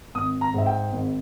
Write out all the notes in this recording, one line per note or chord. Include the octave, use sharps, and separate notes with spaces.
G#1 D#6
A#5
G#2 E5
G5
G#1